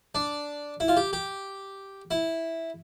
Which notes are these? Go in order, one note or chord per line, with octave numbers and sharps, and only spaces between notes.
D4
E4
F4
G4
G4
E4